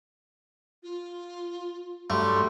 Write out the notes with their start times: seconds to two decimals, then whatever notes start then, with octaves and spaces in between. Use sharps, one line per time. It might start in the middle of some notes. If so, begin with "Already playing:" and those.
0.83 F4
2.10 G2 F#3 G3 A3 C6